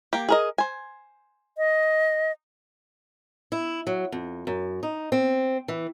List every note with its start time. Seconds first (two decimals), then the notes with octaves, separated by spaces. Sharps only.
0.13 A#3 G4
0.29 G#4 A#4 D#5
0.58 C5 G#5
1.58 D#5
3.52 E4
3.87 F#3
4.12 F2
4.47 F#2
4.83 D#4
5.12 C4
5.68 E3